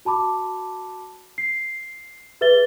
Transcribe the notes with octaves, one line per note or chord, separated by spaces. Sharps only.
F#4 A5 B5 D6
C7
G#4 B4 E5 A6 G7